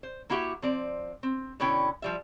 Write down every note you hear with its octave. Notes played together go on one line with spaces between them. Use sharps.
C5
A#3 E4 F#4 G4 E5
F3 C4 D5
C4
B2 D3 C#4 E4 G5
F3 G3 E5